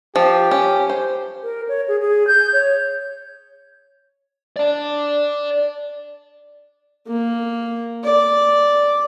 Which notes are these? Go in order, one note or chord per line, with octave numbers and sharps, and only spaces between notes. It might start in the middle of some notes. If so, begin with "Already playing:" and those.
F3 G4
C#4
C5
A#4
C#5
G#4
G#4
G6
C#5
D5 A5
A#3
D5